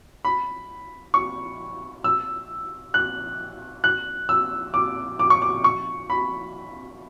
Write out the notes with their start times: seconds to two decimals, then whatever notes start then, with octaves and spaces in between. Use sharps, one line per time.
0.25 B5
1.14 C#6
2.04 E6
2.94 F#6
3.84 F#6
4.29 E6
4.74 D6
5.19 D6
5.30 C#6
5.42 D6
5.64 C#6
6.10 B5